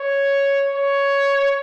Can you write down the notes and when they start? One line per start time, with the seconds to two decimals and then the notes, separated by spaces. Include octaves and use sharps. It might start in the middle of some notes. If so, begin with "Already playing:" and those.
Already playing: C#5
0.75 C#5